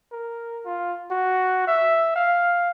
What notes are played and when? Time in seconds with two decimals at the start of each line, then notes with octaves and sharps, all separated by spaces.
0.12 A#4
0.65 F4
1.11 F#4
1.68 E5
2.16 F5